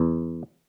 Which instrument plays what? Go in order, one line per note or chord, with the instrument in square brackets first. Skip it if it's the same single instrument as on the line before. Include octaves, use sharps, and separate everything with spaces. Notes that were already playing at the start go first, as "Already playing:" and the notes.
Already playing: [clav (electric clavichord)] E2